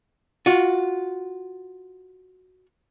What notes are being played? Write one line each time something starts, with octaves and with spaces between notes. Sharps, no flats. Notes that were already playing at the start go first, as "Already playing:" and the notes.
F4 F#4